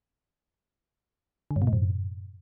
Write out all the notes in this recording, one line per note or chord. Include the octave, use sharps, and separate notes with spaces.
D3
G2
B2
A2
F#2